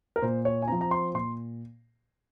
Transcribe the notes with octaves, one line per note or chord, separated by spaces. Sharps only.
A#4
A#2 C5
C#5
G#5
F3 C4 A#5
A#5
C6
A#2 C6